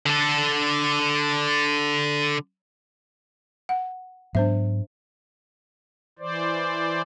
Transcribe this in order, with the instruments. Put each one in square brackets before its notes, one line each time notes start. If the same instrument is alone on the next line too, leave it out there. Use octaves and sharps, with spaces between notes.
[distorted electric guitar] D3 A4
[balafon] F#5
[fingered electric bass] G#2 F#3 B3 [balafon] D4 C5 E5
[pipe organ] E3 C5 D5